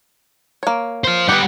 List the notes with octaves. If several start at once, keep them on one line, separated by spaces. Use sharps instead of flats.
A#3 C#5
C5 F5
G3 B3 G4 F#5